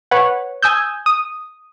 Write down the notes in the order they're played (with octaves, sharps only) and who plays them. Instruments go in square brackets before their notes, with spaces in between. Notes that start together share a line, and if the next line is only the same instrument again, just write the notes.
[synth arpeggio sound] B4 C#5 F#5
G#5 D#6 E6 G6
D#6